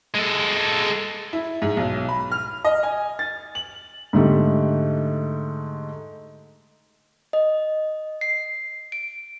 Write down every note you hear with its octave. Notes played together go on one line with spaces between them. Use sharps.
G#3 A4
E4
G#2
B1
B5
F6
D#5
G#5
A6
F#7
G#2 D3 A3 G4
D#5
C7
D7